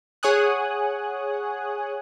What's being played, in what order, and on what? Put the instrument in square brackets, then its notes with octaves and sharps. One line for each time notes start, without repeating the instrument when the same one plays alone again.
[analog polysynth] G#4 C#5 F#5 G#5 D#6 F#6